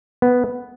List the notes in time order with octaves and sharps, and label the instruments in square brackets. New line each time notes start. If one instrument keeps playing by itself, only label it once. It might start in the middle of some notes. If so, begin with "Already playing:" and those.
[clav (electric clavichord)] B3